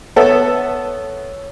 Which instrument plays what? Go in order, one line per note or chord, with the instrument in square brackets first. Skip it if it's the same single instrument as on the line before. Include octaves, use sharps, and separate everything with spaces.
[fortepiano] B3 A4 E5 [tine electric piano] C#5